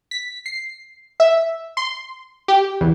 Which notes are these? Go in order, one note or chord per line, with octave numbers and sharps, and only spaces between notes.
B6
C7
E5
C6
G4
E2